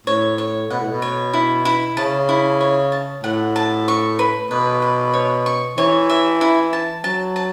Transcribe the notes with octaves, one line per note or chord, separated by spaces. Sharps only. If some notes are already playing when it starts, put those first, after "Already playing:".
A2 C#5
C#5
B2 F#5
A2
B2
C#5
E4
E4
C#3 A5
E4
C#5
A5
A2 F#5
A5
C#6
B4
B2 B4
B4
C#5
C#6
E3 C#5
E5
E4
A5
F#3 A5
A5